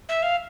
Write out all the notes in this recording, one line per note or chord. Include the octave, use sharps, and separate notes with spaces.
E5
F5